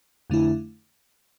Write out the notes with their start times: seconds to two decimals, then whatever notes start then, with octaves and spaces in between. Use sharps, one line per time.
0.30 F2 D3 A3 E4